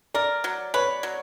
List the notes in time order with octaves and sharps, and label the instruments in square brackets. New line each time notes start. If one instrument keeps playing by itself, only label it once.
[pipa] A#4 [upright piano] D5
[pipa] F#3
[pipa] B4 [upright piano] C#5
[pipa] F#3